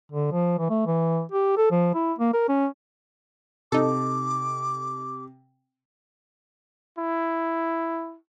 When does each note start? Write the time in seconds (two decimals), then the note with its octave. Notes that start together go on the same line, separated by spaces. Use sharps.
0.12 D3
0.32 F3
0.58 E3
0.70 A3
0.86 E3
1.32 G4
1.57 A4
1.71 F3
1.95 E4
2.19 A#3
2.34 A#4
2.49 C#4
3.72 C3 D#4 A4 D6
6.98 E4